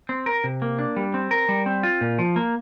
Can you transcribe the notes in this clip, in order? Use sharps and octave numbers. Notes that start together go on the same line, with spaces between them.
C4
A#4
C3
A#3
D4
G3
C4
A#4
G3
C4
F4
A#2
F3
A#3